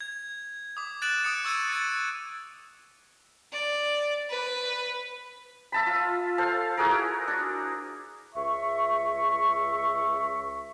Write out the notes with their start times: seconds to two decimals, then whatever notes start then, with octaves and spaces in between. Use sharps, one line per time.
0.01 G#6
0.77 D6 D#6
1.02 F#6 A6 D7 E7 F#7
1.23 D#6 C#7 D7
1.44 C#6 E6 G#6 C#7 D#7
1.68 A6 C#7
3.53 D5
4.30 B4
5.72 E5 A5 B5
5.86 F4
6.38 A4 C5 F5 A5
6.77 E4 F#4 G#4 A#4
7.28 D4
8.35 C#2 E5 C#6